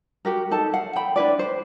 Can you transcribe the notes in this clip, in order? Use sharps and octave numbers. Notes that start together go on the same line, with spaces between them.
F#4 G4 A#4
D#4 A4 A5
F5 F#5
G5 B5
D4 E4 B4 D5
C5